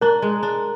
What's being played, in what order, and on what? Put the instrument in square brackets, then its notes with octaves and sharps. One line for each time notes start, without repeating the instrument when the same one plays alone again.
[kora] D4 [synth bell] A#4 A#5
[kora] G#3
D4